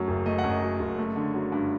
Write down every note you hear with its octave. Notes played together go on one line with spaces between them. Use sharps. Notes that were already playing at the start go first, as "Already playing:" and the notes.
Already playing: F#2 F#3 A3
F#1
A3 D#5
F#5
F#2
D#5
F#3
F#1
A3
D3
F#3
G2